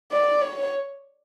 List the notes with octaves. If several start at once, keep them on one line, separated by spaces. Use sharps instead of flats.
D5
C#5